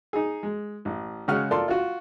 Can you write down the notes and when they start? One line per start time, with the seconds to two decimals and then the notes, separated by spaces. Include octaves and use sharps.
0.13 D#4 G#4
0.43 G#3
0.85 A1
1.28 C#3 G#3 F#4 F#5 F6
1.51 F4 A4 A#4 D5 A5 C6
1.68 F4 F#4